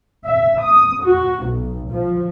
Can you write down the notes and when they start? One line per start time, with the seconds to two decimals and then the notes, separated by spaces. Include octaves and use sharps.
0.25 E5
0.61 D#6
1.02 F#4
1.45 B1
1.91 F3